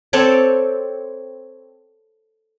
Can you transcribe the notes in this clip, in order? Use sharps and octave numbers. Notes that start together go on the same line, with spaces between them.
C4 A4 C#5 D5